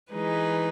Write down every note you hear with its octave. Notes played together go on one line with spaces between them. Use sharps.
E3 G#3 D#4 G#4 B4